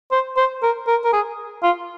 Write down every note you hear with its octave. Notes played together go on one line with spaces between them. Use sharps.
C5
C5
A#4
A#4
A#4
G#4
F4